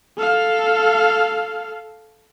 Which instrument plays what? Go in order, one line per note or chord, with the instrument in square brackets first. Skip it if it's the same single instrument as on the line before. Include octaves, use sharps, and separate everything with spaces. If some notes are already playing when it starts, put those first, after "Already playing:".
[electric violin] A4 F5